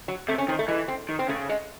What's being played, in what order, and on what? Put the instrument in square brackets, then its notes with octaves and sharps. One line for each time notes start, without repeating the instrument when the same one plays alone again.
[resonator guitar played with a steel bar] F#3
[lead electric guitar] C3 [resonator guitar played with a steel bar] A3
[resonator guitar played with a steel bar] C#4
[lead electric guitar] D#3 [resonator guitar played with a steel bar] C4
[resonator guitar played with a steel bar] A3
[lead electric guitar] E3 [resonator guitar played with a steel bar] G#3
[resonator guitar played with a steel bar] C4
[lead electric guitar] D#3
[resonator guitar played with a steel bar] C4
[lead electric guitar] C#3 [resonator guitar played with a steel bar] A3
[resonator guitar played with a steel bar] G#3